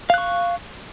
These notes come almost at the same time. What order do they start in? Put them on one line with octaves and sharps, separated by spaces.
F5 F#6 C#6